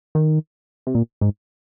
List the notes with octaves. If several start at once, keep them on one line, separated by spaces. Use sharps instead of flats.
D#3
C3
A#2
G#2